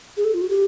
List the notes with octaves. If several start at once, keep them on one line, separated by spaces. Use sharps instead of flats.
G#4
A4
F4
F#4
G4